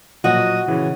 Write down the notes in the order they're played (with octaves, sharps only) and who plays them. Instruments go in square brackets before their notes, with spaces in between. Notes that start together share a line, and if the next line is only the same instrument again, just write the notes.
[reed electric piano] A#2 [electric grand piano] F3 F#3 [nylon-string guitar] F#4 [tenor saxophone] D#5
[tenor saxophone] C#3 [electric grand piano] E3